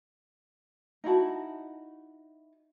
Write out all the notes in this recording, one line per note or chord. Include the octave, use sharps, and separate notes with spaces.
D#4 E4 F#4 A5